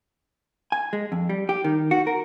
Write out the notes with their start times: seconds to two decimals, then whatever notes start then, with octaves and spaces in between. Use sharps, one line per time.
0.72 G#5
0.93 G#3
1.12 F2
1.29 G3
1.49 G4
1.64 D#3
1.91 F#4
2.07 A#4